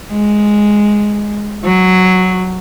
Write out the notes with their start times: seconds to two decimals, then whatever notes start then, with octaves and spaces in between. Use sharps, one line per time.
0.11 G#3
1.64 F#3